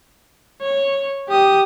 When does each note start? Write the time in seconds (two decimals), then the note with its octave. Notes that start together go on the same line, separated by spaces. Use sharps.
0.62 C#5
1.29 G4 D#6